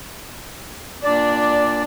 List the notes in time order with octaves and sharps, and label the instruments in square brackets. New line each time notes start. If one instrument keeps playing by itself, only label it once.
[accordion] A#2 D5 [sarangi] D4